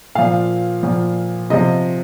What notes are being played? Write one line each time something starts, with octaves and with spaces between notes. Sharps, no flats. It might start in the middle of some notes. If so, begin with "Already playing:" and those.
A#2 F3 F5
A#2 F3
C3 F3 D#5